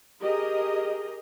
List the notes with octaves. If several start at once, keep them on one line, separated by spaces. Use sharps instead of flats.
G4 G#4 A#4 D#5